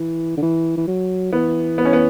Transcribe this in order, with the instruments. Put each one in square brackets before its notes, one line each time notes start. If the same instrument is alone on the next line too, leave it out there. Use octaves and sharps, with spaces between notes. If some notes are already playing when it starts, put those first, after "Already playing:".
Already playing: [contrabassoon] E3
D3
E3
E3
F#3
[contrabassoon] E3 [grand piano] B3
[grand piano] B3
C#4
B3